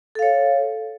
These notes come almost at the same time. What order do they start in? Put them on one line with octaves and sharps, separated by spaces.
A4 F5 C#5